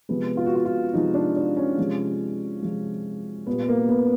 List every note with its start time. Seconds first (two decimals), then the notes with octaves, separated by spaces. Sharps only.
0.09 C3 F3 G#3 B3
0.37 F4
0.46 F#4
0.55 F4
0.65 F4
0.94 C3 F3 G#3 D#4
1.14 D4
1.36 D4
1.57 C#4
1.78 C3 F3 G#3
2.62 C3 F3 G#3
3.47 A#2 G3 B3
3.68 A#3
3.89 B3